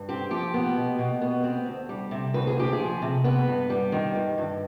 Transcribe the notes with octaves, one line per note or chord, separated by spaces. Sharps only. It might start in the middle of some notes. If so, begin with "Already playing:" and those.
Already playing: G2
C4 G4
F3 G4
B3
B2
B2
B3
C4
D2
G3
C3
D2 B4
G#4
D2 G4
G#4
F3
C3
B3 B4
G2
G3
D#3
G2
G2